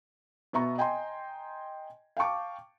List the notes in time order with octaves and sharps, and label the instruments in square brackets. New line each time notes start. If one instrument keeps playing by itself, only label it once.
[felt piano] B2 B3 E5 A#5 C#6
D#5 G5 G#5 A#5 C6
F5 G5 A5 C#6 D6